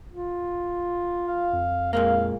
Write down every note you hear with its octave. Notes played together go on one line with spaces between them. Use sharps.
F4
F5
F2
A#2 G#3 A#3 F5